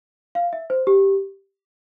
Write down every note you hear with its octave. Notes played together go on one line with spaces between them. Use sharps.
F5
E5
C5
G4